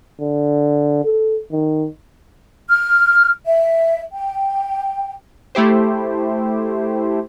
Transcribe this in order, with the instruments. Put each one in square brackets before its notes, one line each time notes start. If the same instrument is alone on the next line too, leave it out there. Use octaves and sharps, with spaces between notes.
[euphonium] D3
A4
D#3
[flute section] F6
E5
G5
[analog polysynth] A3 E4 G4 C5